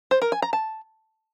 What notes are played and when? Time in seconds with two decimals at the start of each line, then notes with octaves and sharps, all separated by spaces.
0.11 C5
0.22 A#4
0.32 G#5
0.42 A#5
0.53 A5